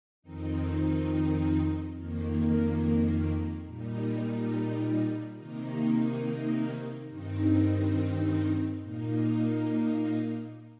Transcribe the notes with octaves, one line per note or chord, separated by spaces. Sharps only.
F2 D#3 C4 D#4
F2 D#3 A#3
A#2 G3 D#4
C3 D#3 A#3 D#4
G2 D#3 C4 D#4
A#2 A#3 D#4